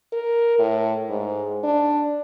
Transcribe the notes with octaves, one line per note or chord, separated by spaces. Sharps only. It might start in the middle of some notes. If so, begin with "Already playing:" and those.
A#4
A2
G#2
D4